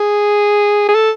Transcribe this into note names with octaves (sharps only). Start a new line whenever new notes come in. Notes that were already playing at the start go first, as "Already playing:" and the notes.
Already playing: G#4
G#4
A4